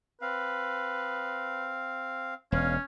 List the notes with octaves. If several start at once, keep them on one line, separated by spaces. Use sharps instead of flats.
C4 B4 F5
E1 C#4 C#5 F5